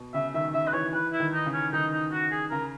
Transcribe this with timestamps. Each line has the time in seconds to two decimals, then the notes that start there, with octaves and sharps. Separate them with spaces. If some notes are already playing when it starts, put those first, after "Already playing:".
Already playing: B2
0.14 C#3 E5
0.34 D#3 E5
0.54 C#3 E5
0.68 B4
0.73 E3 C#5
0.93 E3 B4
1.13 E4
1.20 D#3
1.33 D#4
1.46 C#3
1.53 C#4
1.73 D#3 D#4
1.92 D#4
2.12 F#4
2.31 G#4
2.51 C#3 A#4